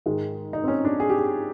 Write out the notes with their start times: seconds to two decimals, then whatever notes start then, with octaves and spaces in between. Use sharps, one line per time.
0.06 G#2 D#3 G#3
0.53 D#4
0.64 C4
0.68 C#4
0.85 D4
1.00 G#4
1.09 G4
1.19 G#4